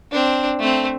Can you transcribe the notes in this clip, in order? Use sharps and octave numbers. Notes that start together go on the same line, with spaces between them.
C4 D4
A3 C4